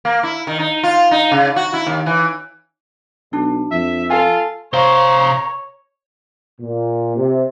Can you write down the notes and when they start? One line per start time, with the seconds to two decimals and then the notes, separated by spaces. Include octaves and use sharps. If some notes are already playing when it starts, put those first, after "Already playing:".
0.05 A#3
0.23 E4
0.47 D#3
0.59 D#4
0.83 F4
1.11 D#4
1.32 C#3
1.56 F#4
1.74 E4
1.87 D#2
2.06 E3
3.33 B1 D4
3.72 F2 E5
4.10 F4 A4 F5 G#5
4.73 C3 C5 C#5 F5 A#5
6.60 A#2
7.16 C3